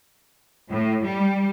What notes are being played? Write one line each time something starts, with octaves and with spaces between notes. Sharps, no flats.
A2
G3